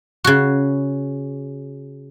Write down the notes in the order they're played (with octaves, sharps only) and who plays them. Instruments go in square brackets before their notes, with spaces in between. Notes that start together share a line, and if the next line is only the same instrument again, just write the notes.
[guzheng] C#3 F#4